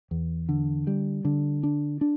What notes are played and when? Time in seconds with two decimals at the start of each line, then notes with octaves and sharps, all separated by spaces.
0.11 E2
0.49 D3
0.87 G3
1.25 D3
1.63 D4
2.01 D4